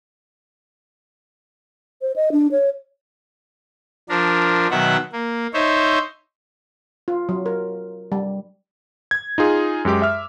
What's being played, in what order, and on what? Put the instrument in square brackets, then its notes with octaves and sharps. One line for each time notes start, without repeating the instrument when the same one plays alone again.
[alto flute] C5
D#5
D4
C#5
[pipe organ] F3 D4 A#4
B2 D#3 F#3 E5 F#5
A#3
D#4 C5 C#5 E5
[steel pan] F4
F#3
A#4
G3
[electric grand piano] G#6
D#4 F4 G#4
F#2 G#3 G4 D6
E5 F6